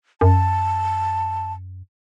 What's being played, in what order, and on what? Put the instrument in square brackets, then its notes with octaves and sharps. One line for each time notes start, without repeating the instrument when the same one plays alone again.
[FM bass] F#2 [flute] A5